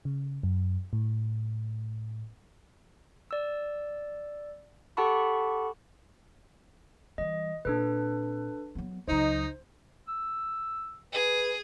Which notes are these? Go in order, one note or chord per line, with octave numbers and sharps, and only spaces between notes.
C#3
F#2
A2
D5 E6
G4 A4 F#5 A5 B5 C#6
E3 G3 D#5
A#2 C4 D4 A4 B4
F#3 B3
C#2 F#3 D#4 C5
E6
G#4 B4